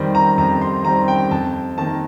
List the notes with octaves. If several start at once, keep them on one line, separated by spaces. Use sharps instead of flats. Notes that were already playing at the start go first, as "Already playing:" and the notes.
Already playing: F2 D#3 G3 C4
A#5
F2 A#5
C6
D#3 G3 C4 A#5
G5
F2 A5
D#3 A#3 A5